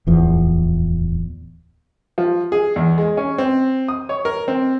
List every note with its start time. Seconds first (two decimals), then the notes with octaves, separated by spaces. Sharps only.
0.07 D1 E2 F3
2.18 F3
2.52 G#4
2.76 E2
2.98 G#3
3.17 C#4
3.38 C4
3.88 D#6
4.09 C#5
4.25 A#4
4.48 C4